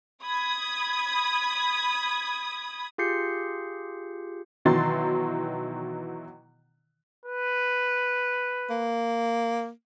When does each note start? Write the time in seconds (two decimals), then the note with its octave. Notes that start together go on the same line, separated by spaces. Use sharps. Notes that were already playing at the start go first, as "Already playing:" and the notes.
0.25 B5 D#6 G#6
2.98 F4 G4 G#4 G6 C7 C#7
4.65 B2 D#3 E3 F#3 C6 A6
7.26 B4
8.70 A#3